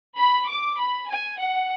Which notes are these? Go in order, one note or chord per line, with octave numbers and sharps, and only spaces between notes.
B5
D6
B5
G#5
F#5